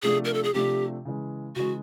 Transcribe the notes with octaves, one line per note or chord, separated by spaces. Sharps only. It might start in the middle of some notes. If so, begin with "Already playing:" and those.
C3 F3 A3 D4 G#4
A#4
A4
G#4
C3 F3 A3 D4 G4
C#3 E3 G#3
C#3 E3 G#3 F#4